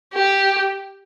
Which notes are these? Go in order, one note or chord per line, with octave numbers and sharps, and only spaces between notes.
G4